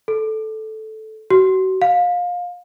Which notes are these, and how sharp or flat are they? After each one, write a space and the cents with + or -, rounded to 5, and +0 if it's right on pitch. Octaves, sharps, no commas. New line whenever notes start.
A4 -10
F#4 +35
F5 +25